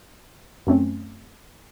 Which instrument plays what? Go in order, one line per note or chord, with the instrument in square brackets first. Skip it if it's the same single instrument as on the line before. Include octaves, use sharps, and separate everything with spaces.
[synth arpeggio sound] F#2 A3 C4 C#4